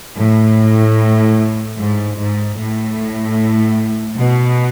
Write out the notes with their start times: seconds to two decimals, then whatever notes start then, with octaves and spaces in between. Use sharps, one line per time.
0.18 A2
1.78 G#2
2.18 G#2
2.58 A2
4.17 B2